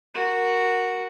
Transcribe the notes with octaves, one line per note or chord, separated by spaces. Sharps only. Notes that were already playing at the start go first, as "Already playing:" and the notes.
F#4 A#4